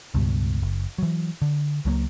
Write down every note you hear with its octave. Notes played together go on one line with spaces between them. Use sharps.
C#2 G2 B2
F#1
E3 F#3
D3
C#2 F#3 G#3 A#3